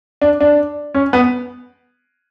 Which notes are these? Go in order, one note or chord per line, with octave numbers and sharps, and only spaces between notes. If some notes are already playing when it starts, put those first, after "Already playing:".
D4
D4
C#4
B3